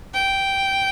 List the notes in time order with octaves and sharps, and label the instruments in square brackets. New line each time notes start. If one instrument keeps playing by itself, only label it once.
[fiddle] G5